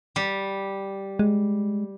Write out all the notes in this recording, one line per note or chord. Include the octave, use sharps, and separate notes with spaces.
G3
G#3